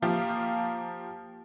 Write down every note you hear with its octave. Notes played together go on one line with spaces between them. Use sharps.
F3 A#3 F4 G4